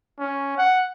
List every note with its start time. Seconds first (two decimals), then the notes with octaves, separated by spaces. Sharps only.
0.19 C#4
0.58 F#5